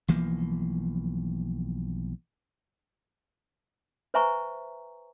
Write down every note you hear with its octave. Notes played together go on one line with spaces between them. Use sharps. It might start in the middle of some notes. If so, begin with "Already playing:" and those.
B1 E3 F3 A#3
B4 C5 E5 G#5 A#5 C#6